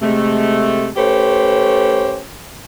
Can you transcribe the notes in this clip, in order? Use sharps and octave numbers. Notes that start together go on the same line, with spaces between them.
C3 G#3 A3
A3 C#4 G4 B4 C5